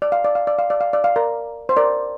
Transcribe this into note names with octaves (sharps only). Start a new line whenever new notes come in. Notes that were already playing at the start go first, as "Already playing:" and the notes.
D5
F5
D5
F5
D5
F5
D5
F5
D5
F5
A#4 D5
C5
A#4 D5